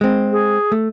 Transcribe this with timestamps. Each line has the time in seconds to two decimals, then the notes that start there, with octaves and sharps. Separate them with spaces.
0.01 G#3 C4
0.32 G#4
0.72 A3